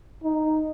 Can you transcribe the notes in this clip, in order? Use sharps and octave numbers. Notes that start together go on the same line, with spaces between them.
D#4